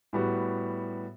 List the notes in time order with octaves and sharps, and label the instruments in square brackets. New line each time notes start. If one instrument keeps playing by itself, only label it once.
[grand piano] A2 G3 B3 F#4